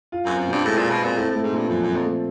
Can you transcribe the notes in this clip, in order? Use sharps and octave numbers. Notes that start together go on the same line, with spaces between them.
F4
F#2
C4
F#2
G2 B2
A2 G#3
A#2 F4
B2
A#2 C4
A2 C4
A2 A3
G#2
G2 A#2
F#2 F3
F#2 C4
F2
A3